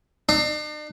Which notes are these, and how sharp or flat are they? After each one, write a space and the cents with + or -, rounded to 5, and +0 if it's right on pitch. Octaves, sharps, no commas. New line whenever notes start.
D4 +45